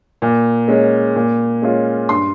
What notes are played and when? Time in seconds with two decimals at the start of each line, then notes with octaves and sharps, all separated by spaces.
0.22 A#2
0.68 G#3 C#4
1.16 A#2
1.62 G#3 C#4 F4
2.09 G2 C6